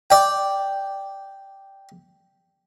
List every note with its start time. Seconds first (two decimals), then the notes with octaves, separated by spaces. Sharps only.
0.10 D5 G5